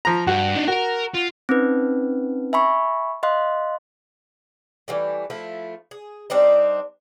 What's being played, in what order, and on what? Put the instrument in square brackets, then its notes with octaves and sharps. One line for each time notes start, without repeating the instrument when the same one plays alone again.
[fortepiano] F3 A#5
[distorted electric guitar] G2 [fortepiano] F#4
[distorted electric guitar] D4 D#4
[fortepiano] F#4 [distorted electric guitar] A#4
[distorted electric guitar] F4
[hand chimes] C4 C#4 D#4 B4
E5 G#5 B5 C#6
D#5 F5 C6 F#6
[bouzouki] E3 G3 A3
F3 A3 E4
G#4
G3 C4 D4 D#4